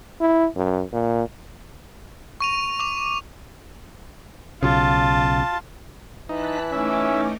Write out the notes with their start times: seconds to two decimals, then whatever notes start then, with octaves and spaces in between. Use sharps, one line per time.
0.21 E4
0.56 F#2
0.93 A#2
2.40 C#6 D#7 F7
2.80 D6 F7
4.63 B1 C#3 F4 A5
6.29 E3 D#4 A5 F#6 B6
6.72 A3 C#4 D#4 E5 D6